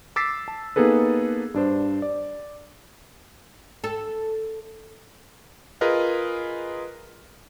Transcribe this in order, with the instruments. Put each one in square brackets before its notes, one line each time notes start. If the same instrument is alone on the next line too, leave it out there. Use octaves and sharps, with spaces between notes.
[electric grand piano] D6 E6 A6 B6 C7
A5
A#3 B3 D#4 G#4 A4 B4
G2 D4 C5
D5
[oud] A4
[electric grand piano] F4 G#4 A#4 B4 D#5